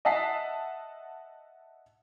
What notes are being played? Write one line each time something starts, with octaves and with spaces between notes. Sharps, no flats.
D#5 E5 F#5 A5 B6 C7